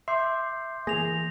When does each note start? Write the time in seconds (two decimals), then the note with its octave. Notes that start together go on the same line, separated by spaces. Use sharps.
0.08 E5 C6 D6 G6 C7
0.87 E3 A#3 G#4 A#6 F7